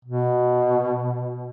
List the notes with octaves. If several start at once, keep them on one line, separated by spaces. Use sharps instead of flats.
B2